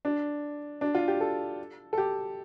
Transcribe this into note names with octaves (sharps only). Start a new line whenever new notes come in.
D4
D4
F4
G4
A4
A4
G4